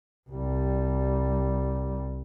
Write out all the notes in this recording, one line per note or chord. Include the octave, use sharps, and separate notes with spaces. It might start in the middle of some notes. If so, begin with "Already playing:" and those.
C2 G3